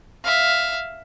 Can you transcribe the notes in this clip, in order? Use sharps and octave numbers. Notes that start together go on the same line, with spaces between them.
E5 F5